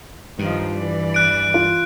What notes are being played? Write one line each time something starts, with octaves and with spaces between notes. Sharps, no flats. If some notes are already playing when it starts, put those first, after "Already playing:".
G2 D#3 F3
E3 D5
F#6 D7
F4